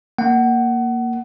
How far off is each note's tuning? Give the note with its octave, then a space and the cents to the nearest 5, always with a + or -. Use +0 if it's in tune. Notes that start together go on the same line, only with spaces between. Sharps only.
A#3 +0 F#5 +25